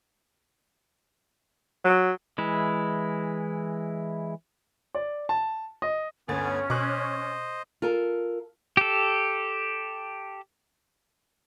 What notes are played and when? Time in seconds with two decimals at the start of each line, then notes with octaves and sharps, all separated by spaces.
1.84 F#3
2.38 E3 G#3 E4
4.95 D5
5.29 A5
5.82 D#5
6.28 G1 D2 B3 C#4 G#5 A6
6.70 B2 C5 D#5 C#6 D6 F#6
7.82 F4 A4 A#4
8.77 G4 A4